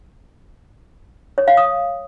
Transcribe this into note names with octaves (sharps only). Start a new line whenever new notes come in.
C#5
F5
D#6